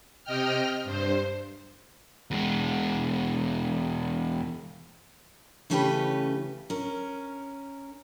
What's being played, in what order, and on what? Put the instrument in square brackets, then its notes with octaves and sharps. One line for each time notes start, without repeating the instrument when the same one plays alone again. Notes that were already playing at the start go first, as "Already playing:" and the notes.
[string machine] C3 D#5 G5 F6
G2 C5
[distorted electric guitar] E2 G#3
[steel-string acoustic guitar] C#3 E3 A3 C#4 G4 B4
C#4 A#4